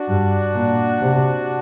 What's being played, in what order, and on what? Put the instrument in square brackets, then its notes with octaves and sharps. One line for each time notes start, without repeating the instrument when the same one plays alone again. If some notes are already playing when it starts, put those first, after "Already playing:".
Already playing: [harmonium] D4 F#4
[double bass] G2
A#2
C3